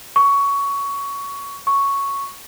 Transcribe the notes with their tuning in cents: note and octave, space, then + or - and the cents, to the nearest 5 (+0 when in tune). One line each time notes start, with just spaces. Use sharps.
C#6 +15
C#6 +0